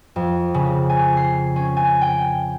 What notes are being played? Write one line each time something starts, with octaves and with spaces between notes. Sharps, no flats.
F2
C#3
G#5
C7
C#4
G#5
G5